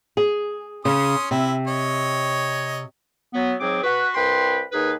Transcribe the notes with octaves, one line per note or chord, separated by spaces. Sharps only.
G#4
C#3 C#4 C6 D#6
C3 E4
C#5 D#5
F#3 B3
G#2 F#3 C4 G#4 D6
F#4 B4
C2 B4 G5 B5 C6
D#2 D#4 G#4 B4